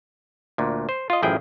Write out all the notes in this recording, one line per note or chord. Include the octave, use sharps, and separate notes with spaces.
D2 A#2
C5
F4 D#5
A1 F#2 F3 E4 G#4 G5